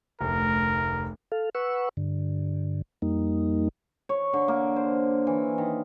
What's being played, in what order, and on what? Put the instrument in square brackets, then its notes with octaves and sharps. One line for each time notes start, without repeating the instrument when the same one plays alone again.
[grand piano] F1 D2 [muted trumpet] A#4
[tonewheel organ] A4 F5
B4 F#5 C#6 E6
G2 D3
F2 G3 A#3 D#4
[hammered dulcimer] C#5
D3
A#3
C5
E3
D#3